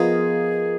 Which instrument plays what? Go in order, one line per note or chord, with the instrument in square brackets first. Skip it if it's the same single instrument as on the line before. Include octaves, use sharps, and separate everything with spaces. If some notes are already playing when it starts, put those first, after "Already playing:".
Already playing: [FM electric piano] F3 B3 F4 A#4 D#5 [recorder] G#4